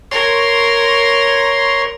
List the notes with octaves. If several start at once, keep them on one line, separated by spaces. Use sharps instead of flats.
A#4 C#5 C6